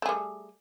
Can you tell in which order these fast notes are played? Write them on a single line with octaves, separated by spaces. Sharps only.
A3 G#4 G3